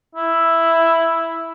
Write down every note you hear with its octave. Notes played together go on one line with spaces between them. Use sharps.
E4